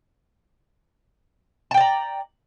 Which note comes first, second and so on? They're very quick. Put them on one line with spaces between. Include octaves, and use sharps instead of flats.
A5 G5 D5 A#5